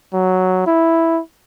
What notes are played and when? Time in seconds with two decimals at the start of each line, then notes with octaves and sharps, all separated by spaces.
0.14 F#3
0.66 E4